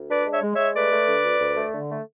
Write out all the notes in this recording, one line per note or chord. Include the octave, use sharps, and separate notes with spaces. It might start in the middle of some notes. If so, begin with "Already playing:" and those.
Already playing: D2
D4 B4 D5
G#3
C#5 E5
G#3
G#3 C#5 E5
A3 B4 D5
A3
D3
D2
D2
A3
D3
A3